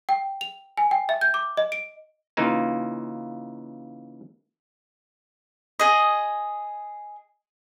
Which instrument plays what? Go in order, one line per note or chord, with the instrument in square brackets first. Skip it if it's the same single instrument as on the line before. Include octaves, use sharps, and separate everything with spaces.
[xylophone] G5
F7
G#5
G5
E5
G6
D6
D#5
D7
[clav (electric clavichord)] C#3 E3 A#3 D#4 F4
[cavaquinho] G#4 D#5